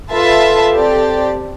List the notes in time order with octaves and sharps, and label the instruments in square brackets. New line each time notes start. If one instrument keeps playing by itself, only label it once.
[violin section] F4 B4 E5 A5 [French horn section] A4
[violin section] C4 G4 D5 A5